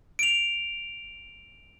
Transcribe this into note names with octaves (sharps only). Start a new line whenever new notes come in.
D7 F7